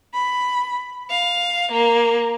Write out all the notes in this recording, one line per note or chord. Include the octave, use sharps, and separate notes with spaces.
B5
F5
A#3